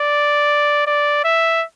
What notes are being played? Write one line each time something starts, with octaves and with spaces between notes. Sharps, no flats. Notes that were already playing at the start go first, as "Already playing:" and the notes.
Already playing: D5
D5
E5